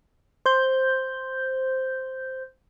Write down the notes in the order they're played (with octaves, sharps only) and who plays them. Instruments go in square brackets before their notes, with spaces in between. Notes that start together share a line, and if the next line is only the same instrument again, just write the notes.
[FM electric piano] C5 G6